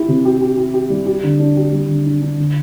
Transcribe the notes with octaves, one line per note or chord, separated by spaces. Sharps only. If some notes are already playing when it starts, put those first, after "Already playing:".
Already playing: E4 G4
C3
G4
G4
G4
G4
G3
G4
D3
D4
G4
G3
D3
D4
D4
D3